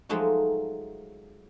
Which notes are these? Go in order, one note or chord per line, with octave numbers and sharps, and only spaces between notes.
F3 F#3 G#3 A3 D#4 F#4